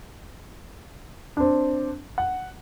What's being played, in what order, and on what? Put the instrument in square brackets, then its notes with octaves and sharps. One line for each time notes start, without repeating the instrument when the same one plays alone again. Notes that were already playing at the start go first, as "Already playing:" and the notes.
[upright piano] C4 D4
F#5